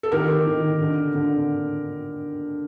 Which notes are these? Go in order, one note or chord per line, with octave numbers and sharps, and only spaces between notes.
A4
D#3 G4 A#4
D#3
D3
D3